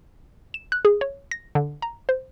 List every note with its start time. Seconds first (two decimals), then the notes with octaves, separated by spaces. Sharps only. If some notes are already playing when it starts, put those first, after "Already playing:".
0.54 E7
0.72 F#6
0.85 G#4
1.01 C#5
1.31 A#6
1.55 D3
1.82 A#5
2.09 C5